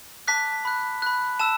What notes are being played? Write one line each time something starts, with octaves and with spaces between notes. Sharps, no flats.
A5 D6 F#6 B6
B5 F#6
B5 F#6
A5 E6 E7